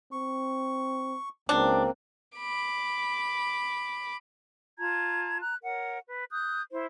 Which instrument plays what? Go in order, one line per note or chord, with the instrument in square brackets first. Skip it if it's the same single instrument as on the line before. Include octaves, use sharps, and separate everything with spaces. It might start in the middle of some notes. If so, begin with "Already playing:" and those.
[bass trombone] C4 [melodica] C#6
[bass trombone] C#2 [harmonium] A#3 C4 [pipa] D4
[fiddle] B5 D6
[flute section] F4 A5 A#5 G#6
A#5 F#6
A#4 C#5 F#5
B4
D#6 F#6 G6
E4 C5